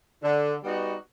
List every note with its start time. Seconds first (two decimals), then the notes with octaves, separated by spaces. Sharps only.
0.23 D3
0.62 G3 B3 D#4 F#4